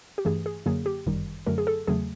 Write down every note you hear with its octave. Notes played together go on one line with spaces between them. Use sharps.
G4
G2 E3 A3 G#4
G#4
F#2 D3 F#3 A#3 G#4
G4
G1 F#2 D#3 G3
F#2 D3 F#3 A3 A#4
G#4
A4
E2 C#3 F#3 A3 G#4